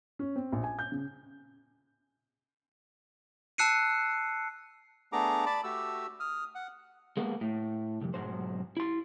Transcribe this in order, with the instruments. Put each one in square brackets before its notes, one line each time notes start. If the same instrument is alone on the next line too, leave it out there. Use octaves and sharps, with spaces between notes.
[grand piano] C#4
C4
A#1
G#5
G6
C#3
[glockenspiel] A5 E6 F#6 C7 C#7 D#7
[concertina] A3 B3 D4 G#4 A#5 D6
D5 A5 B5 D6
A3 F#4 G4 E6
D#6 F6
F#5
[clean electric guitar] G#3 A#3 B3
A2
C2 F2
B1 G#2 F#3 C5
E4 C6